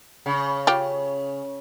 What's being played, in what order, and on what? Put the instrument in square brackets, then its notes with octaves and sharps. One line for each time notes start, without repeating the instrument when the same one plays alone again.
[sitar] C#3
[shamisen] F4 G4